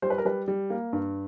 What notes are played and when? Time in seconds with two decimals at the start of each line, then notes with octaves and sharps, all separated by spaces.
0.02 G3 C5
0.10 B4
0.18 A#4
0.25 G3 B4
0.48 G3
0.70 A#3
0.93 G2